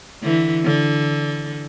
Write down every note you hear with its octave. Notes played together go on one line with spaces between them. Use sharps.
D3 E3
D3